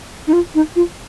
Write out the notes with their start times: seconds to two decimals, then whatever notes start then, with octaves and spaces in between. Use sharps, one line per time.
0.27 D#4
0.33 F4
0.55 D#4
0.76 F4